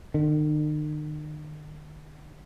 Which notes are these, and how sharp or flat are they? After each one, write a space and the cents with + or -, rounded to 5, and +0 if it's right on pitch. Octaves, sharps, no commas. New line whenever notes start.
D#3 -45